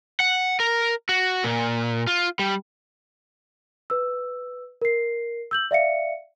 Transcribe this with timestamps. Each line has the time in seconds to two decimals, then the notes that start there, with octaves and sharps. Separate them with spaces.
0.20 F#5
0.60 A#4
1.09 F#4
1.44 A#2
2.07 F4
2.39 G3
3.90 B4 E6
4.82 A#4 C7
5.51 E6 G6 F#7
5.71 D5 E5 F5 C#7